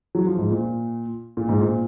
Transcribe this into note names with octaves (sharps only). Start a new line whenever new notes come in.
F#3
F3
G#2
A#2
A#2
G#2
A#2